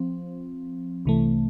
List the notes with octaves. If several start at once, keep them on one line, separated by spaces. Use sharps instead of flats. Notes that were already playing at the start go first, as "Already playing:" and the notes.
Already playing: F3 C4
C2 C3 E3 A3